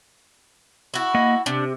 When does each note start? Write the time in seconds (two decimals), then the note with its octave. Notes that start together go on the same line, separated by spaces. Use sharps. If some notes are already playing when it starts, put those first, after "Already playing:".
0.94 E4 F#4
1.15 A#3 D#5 F#5
1.46 C3 D4